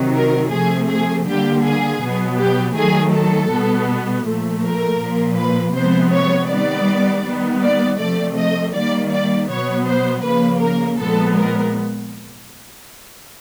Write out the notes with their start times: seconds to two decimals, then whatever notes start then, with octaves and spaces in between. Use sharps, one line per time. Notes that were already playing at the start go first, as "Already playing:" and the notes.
Already playing: C3 D#3 F#3
0.14 A#4
0.51 C3 F3 A3 G#4
0.89 G#4
1.27 D3 G3 A#3 G4
1.64 G#4
2.01 B2 F#3 B3
2.38 G4
2.76 D#3 F#3 A3 G#4
3.13 A4
3.51 B2 G3 B3
4.26 A#2 F3 A3
4.64 A#4
5.01 A#2 F3 A#3
5.37 B4
5.75 C3 F3 G#3 B3 C5
6.13 C#5
6.50 D#3 G3 B3 D5
7.25 D#3 G3 B3
7.63 D5
7.99 C3 F3 A3 D5
8.38 D#5
8.74 D#3 G3 A#3 D5
9.13 D5
9.50 B2 F#3 B3 C#5
9.88 C5
10.25 C#3 F3 A#3 B4
10.62 A#4
10.99 A#2 F3 G#3 B3 A4
11.37 A#4